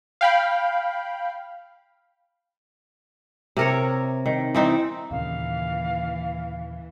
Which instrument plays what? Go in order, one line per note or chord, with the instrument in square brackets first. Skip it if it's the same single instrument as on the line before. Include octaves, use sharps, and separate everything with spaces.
[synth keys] F5 G5 B5
[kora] C3 A#4 C#5
D#3
E3 C4 D#4
[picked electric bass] D#2 A#2 C#3 [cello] E3 [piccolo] F5